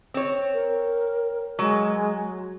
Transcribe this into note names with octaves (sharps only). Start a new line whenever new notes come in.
C4 C#5
A#4
F#3 G#3